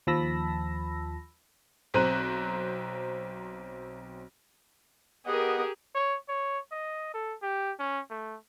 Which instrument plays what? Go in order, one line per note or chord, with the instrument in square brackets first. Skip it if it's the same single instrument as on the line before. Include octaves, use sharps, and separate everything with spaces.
[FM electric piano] D#2 F3 A5 B5 E6 A#6
[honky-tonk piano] B1 C4 C5 A#5 F#6 D#7
[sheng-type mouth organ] B3 D#5 F#5 [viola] G4 G#4 [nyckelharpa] A#4 D#6
[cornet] C#5
C#5
D#5
A4
G4
C#4
A3